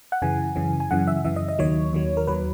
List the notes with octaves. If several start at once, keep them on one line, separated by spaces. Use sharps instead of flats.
F#5
F#2 C#3 E3 G#5
F#2 C#3 E3
G#5
F#2 C#3 E3 F#5
E5
F#2 C#3 E3 E5
D#5
D#5
D#2 D#3 F#3 C#5
D#2 D#3 F#3
A#4
D#2 D#3 F#3 B4